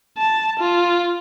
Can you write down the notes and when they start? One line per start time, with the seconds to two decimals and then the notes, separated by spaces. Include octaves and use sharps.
0.18 A5
0.59 F4